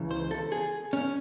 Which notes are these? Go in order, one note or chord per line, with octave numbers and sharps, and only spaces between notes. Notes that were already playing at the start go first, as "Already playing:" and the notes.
Already playing: C#2 C#3 E3
C5
A4
G#4
C#4